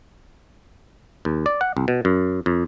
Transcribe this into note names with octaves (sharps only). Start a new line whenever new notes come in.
D#2
D5
F#5
C2
B2
F#2
F2